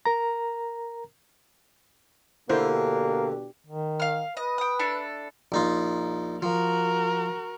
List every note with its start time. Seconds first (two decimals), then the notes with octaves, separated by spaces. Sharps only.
0.06 A#4 A#5
2.50 B2 D3 A#3 D4 E4 G4 C5
3.67 D#3
4.00 F5 F6
4.37 B4 D#5
4.58 G5 D#6
4.79 D4 E4 A4
5.52 A#1 D#4 F4
6.42 F3 F#4 A#4